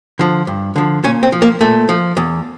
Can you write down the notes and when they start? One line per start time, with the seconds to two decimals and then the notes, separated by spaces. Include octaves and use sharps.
0.19 D3 F3
0.47 G2
0.76 D3 F3
1.04 A#2 C#4
1.23 C4
1.32 F3
1.42 A#3
1.61 A#2 A3
1.89 F3
2.17 E2